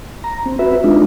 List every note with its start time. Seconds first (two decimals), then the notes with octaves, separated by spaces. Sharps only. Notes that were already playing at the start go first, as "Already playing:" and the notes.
0.24 A#5
0.46 C4
0.59 F#4 B4 E5
0.84 G#3 D4 D#4 F4